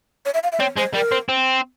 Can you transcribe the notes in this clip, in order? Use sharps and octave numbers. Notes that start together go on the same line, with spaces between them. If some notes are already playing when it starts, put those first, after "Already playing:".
C#5
E5
F5
E5
C4 C#5
G#3 C5
G3 A#4
C4
C4